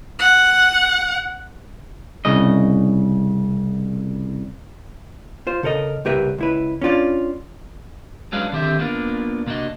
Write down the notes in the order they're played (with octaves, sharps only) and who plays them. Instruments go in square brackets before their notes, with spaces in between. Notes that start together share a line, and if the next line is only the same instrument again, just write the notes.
[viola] F#5
[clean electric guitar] C2 C#3 D#5
[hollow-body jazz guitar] F4 C5
C#3 A4 A#4 D#5
C2 C#3 G4 A#4 B4 E5
C#2 E4 B4
C#4 D4 F4 D5
[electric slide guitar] F#3 G#3 C#4 D4 B4 F5
D3 D#3 C4 G4 C5 E5
A#3 B3 D4 F4 A#4
C3 A#3 D4 F#4 D#5